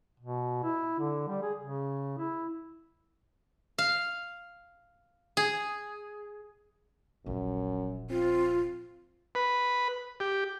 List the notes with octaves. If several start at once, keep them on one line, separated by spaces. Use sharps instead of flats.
B2
E4
D3
G3
G#4
C#3
E4
F5
G#4
D#1 A#1 F#2
C4 F4
B4
G4